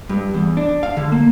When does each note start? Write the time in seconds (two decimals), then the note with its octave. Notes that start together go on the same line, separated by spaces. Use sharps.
0.09 G2
0.34 E2
0.57 D4
0.83 F5
0.97 D3
1.12 A#3